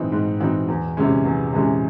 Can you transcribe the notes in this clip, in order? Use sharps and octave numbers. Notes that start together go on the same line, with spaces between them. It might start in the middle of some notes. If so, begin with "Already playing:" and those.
Already playing: G#2 E3 C4 D#4
G#2
E3 C4 D#4
E2
C3 E3 G#3 C#4
E2
C3 E3 G#3 C#4